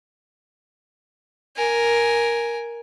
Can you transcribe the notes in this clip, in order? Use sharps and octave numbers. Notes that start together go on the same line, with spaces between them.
A#4 G#5